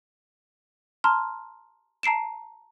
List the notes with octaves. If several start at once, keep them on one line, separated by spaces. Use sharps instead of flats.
A5 A#5 C6 F6
A5 A#5 C7 D7 E7